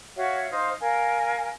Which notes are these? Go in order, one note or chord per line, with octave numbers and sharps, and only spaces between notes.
F#4 C#5 E5 F5
D#4 C5 F5
A#4 F5 G#5